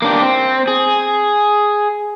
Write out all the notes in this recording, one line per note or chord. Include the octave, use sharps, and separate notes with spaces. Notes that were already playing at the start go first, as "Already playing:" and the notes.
A#3 D4 G4
C4
G#4